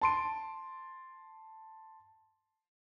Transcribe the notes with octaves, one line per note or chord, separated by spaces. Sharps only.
A5 C6 D7